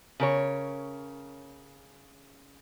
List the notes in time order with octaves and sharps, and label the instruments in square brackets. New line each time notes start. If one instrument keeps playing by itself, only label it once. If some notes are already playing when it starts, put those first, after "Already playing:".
[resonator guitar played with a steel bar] C#3 A#4 C#5